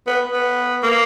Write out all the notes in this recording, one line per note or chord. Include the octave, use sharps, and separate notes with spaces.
B3
B3
A#3